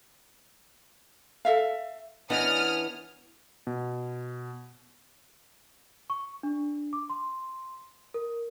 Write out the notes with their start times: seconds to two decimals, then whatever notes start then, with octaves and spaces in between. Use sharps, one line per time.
1.45 A4 E5 F5
2.30 E3 B3 C#4 D4 D5 D#5 D#6 F6
3.67 B2
6.10 C#6
6.43 D4
6.93 D6
7.10 C6
8.14 A#4